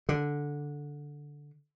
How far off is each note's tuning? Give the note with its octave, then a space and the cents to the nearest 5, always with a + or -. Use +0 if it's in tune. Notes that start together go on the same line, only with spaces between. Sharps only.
D3 -5